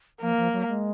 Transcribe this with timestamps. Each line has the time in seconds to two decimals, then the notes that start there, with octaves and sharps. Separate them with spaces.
0.22 F3 A#3
0.37 F3
0.53 F#3
0.68 G#3